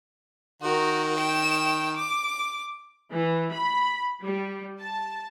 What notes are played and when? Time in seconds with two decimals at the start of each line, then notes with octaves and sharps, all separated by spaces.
0.62 D#3 F#4 A#4
1.18 G5 E7
1.96 D6
3.11 E3
3.53 B5
4.23 G3
4.79 A5